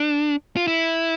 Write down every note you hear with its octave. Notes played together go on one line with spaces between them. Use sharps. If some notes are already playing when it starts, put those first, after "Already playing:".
Already playing: D4
F4
E4